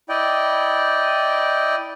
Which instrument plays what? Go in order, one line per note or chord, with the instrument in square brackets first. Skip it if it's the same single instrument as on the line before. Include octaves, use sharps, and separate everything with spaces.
[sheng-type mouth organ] E4 D5 D#5 G5